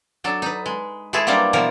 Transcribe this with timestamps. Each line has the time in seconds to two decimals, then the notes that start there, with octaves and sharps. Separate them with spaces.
0.24 F#3 D4 A4
0.42 D#4 B4
0.66 G#3
1.13 G#3 A3 E4 G#4 A4 B4
1.27 F#3 G3 A#3 D4 C5 D5
1.53 B2 E3 F3 A#4